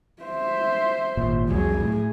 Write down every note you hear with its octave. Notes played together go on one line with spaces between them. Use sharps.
C5 E5
G#1 A#2
C2 F2 F#3 G#4
A2